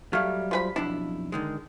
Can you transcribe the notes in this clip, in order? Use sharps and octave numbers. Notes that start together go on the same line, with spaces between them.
F#3 G3 A3 F5 F6
F3 B4 B5
B1 F2 D4 E4
D3 D#3 G#3